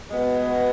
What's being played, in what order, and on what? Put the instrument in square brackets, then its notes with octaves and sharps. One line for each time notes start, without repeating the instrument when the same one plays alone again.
[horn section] B2 G#3 B3